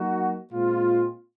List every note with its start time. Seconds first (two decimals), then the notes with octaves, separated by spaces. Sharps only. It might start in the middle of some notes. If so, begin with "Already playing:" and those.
Already playing: F#3 A#3 D#4 F#4
0.50 A#2 G#3 C4 F4